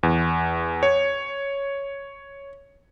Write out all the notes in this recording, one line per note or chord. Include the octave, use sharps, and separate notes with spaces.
E2
C#5